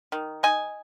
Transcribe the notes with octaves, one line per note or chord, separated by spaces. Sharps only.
D#3
D#4 D#5 G#5